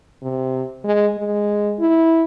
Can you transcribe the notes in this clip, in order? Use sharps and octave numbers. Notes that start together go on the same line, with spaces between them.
C3
G#3
G#3
E4